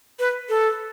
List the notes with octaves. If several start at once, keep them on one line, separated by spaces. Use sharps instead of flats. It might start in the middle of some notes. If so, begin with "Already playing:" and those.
B4
A4